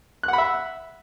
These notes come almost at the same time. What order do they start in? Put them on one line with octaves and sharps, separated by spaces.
F#6 F#5 B5 E5